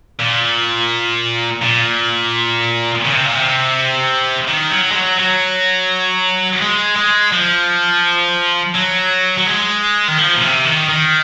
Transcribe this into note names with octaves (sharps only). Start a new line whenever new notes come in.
A#2
A#2
C#3
C3
A#2
C3
D#3
F#3
G#3
F#3
F#3
G#3
G#3
F3
F#3
F#3
G#3
D#3
F3
A#2
C3
D#3
D#3